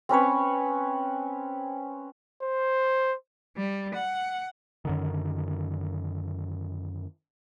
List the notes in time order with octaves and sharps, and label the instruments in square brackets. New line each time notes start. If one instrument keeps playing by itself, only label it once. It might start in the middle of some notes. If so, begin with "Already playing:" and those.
[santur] C4 C#4 B4 C#5
[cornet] C5
[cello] G3
F#5
[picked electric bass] F#2 D3 D#3